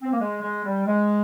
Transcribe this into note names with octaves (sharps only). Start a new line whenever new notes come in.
C4
A#3
G#3
G#3
G3
G#3